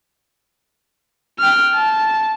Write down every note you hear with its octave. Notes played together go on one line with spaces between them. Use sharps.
G5 F6
A5